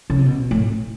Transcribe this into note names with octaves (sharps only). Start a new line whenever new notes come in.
C#3
C3
B2
A2